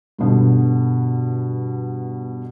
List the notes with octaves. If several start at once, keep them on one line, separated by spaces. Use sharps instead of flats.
G2 B2 D3